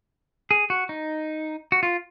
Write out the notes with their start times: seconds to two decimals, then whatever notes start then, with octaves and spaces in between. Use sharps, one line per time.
0.51 G#4
0.70 F#4
0.89 D#4
1.72 F#4
1.83 F4